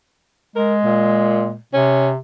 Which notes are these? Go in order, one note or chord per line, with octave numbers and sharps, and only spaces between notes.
G#3 A#4
A#2
C3 C#4